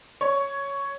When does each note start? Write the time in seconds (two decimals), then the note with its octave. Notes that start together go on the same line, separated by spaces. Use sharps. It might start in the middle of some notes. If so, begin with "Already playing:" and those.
0.21 C#5